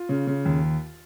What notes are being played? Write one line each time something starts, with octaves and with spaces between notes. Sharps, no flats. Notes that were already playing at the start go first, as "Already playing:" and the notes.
Already playing: F4
C#3
C#3
D#2